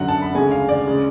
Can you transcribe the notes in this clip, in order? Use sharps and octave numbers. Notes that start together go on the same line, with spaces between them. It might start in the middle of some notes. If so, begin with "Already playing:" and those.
Already playing: F#2 D3 F#3 F#5
A5
B5
D2 C#3 G#3 G#5
F5
D5
C#3 G#3